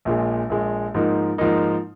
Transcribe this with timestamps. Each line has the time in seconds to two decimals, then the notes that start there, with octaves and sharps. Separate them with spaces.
0.05 A#1 A#2 G#3
0.50 A#1 A#2 G#3
0.94 G#2 F3 A#3 D#4
1.38 G#2 F3 A#3 D#4